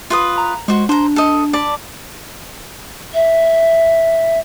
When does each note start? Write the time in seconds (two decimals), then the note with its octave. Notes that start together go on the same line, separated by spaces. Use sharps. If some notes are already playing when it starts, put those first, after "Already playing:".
0.10 F4 B4 D#6
0.38 A#5
0.68 G#3 F#4 C5 C#6
0.89 D4 C5 A#5
1.16 A4 D#5
1.53 D5 A5 B5
3.14 E5